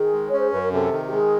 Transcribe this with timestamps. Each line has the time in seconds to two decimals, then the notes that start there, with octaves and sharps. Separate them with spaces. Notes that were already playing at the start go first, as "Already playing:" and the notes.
Already playing: D#3 G#4
0.13 G#3
0.27 C#5
0.33 C#4
0.39 C5
0.50 F#2 B4
0.62 A#4
0.72 C3 A4
0.92 D#3
1.06 G4
1.12 G#3 G#4